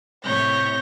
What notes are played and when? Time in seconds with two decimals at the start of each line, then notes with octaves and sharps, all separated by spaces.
0.24 A2 C3 C#5 G6 A#6